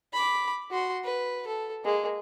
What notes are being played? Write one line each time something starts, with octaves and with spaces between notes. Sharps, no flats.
B5 D6
F#4 C6
B4
A4
G#3 A#3